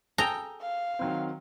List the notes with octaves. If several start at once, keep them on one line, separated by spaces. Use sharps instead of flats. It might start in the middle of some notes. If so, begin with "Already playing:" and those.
G#4 A4 G5 A#5 G7
F5
D#3 F#3 C4